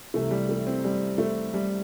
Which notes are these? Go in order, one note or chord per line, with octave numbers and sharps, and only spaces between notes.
C2 C3 E3 A3
G3
A3
C4
G3
A3
G3